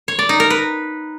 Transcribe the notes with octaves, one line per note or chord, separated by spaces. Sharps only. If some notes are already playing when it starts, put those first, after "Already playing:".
C#5
D5
D#4
A#4
B4